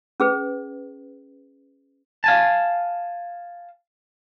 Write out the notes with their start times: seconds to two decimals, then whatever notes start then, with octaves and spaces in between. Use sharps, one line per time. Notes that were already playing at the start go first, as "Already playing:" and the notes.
0.20 C#4 G#4 B4
2.24 F5 G#5 A5